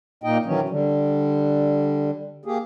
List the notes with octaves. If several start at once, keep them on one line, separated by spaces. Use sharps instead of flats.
A#2 A#3 D#4 D#5 G5
D#3 E3 F#3 C#4
D3 G3
A#3 G4 G#4